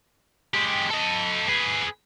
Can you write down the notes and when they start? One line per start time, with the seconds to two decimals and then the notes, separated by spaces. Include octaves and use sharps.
0.54 G#3 G4
0.91 A4 D#5
1.48 G#4 B4